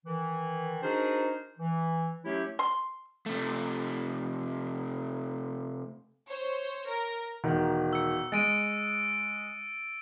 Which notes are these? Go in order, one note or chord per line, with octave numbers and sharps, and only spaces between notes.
D#3 E3
D4 D#4 F#4 G#4 A#4 C5
E3
F#3 A3 C#4 E4 G4
C6
C3 A3
C5 C#5
A#4
E1 D#3
E6 C#7
G#3 A6 D7 D#7